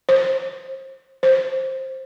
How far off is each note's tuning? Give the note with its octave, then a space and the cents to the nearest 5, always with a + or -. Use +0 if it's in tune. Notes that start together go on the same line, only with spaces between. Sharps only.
C5 +35
C5 +15